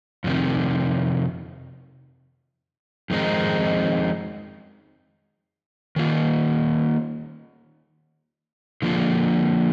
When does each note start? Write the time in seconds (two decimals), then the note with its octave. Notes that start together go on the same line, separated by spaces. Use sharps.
0.24 F2 C3 D#3
3.10 F2 D#3 G#3 C4 D#4
5.96 D#3 A#3 F4
8.82 D3 F3 A#3 F4